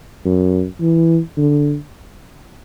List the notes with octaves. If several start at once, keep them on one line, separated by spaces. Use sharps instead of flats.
F#2
E3
D3